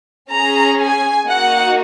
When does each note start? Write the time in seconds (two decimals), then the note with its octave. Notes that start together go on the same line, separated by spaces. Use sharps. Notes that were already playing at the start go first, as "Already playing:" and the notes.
0.33 C#4 G#4 A#5
0.81 G#5
1.29 A#3 D#4 F#4 F#5